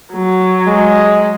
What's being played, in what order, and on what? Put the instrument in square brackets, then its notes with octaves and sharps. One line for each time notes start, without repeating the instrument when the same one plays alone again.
[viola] F#3
[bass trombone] G#3